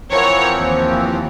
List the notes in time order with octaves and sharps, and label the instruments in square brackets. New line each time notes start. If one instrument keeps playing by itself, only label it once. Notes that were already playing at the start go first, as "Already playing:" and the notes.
[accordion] E3 F3 C4 [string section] A#4 C#5 F#5
[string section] D#2